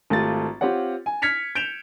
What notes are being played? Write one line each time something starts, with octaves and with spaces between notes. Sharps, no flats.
G#1 A3 F4 G4 A6
C4 F4 G4 C#5 F#5
G#5
F6 G#6 B6 C#7 F7
G6 D7 E7 F7